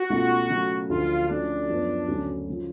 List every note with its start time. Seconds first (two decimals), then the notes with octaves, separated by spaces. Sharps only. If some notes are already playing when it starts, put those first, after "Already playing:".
Already playing: F#4
0.10 C#2 B2 A3 F4
0.50 C#3 F#3 A3
0.90 D2 D3 F3 F4
1.29 F3 A3 C#4 D4 F#4
1.69 F#2 F3 B3
2.08 D2 C#3 F#3 C#4
2.50 C#3 F3